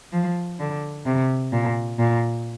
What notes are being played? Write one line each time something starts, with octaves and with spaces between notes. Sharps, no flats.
F3
D3
C3
A#2
A#2